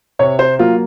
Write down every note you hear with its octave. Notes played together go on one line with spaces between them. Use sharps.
C3 C#5
C5
F#3 A#3 F4